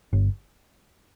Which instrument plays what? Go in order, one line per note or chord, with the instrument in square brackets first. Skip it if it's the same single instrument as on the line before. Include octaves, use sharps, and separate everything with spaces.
[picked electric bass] G1